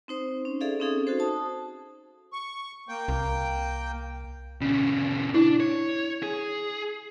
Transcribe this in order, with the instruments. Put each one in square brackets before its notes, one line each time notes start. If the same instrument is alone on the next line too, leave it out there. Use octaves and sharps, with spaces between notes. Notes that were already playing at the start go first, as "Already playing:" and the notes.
[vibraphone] C4 D#4 C5
C#4
G#4 A4 D5 E5 F5
C4 C#4 D#4 G#4 A4
F#4 A4 C5
A5 D#6
[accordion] C#6
A#3 G5
[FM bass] C2
[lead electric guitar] A#2 C#3 [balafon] C#4
[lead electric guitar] D4 [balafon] E4
[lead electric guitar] C#5
G#4